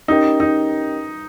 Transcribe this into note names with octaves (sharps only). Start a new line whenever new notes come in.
C#4 D#4 G4 A#4 D#5 G5
D#4